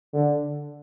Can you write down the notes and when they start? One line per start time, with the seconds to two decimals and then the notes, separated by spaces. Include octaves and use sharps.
0.13 D3